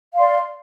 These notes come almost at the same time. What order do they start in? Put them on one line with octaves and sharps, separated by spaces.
F5 C6 D5